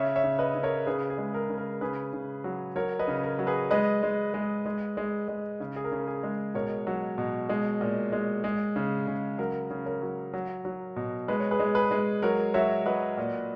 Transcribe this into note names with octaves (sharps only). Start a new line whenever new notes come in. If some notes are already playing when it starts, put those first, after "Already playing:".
Already playing: C#3 C#5 E5
C#5 E5
C#3
B4 D#5
C#3
A#4 C#5
C#3 G#4 B4
G#4
G#3
A#4
C#3
A#4
C#3 G#4 B4
C#3
F#3
F#3 A#4 C#5
B4 D#5
C#3
A#4
F#3
G#4 B4
G#3 B4 D#5
G#3
G#3
G#3
G#3
G#3
C#3
G#4
A#4
C#3
G#4
G#3
B2 A#4 C#5
F#3
B2
G#3
A#2
G#3
G#3
C#3
C#3
F#3 A#4
C#3
A#4 C#5
F#3
F#3
F#3
B2
G#3 B4
C#5
G#4 B4
G#3
G#4 B4
G#3
F#3 A#4 C#5
F#3 C#5 E5
F#3 B4 D#5
A#2